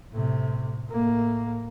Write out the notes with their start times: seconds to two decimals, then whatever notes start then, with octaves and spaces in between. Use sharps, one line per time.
0.12 A2 C3
0.88 A2 A#3